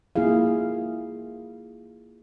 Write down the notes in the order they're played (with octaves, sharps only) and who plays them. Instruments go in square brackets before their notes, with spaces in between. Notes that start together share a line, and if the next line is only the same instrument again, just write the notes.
[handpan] A#3 E4 F4 G#4 F5